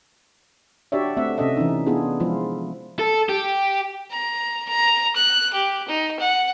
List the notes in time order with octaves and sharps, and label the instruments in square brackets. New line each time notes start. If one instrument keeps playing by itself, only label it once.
[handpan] D4 F#4 G4 C#5 D5 E5
A3 C4 E5 F#5
C3 C#4 A4 D#5 E5
E3 C#4 D#4
B3 D4 E4 F4 G#4
F3 G#3 E4 F4
[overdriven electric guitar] A4
G4
[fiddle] A#5
A#5
F#6
G4
D#4
F#5